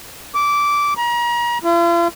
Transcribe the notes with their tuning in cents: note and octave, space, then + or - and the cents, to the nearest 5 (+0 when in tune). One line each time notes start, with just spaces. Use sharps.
D6 -15
A#5 +35
F4 -45